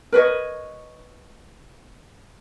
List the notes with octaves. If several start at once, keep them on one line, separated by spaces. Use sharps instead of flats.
A#4 B4 C#5 D#5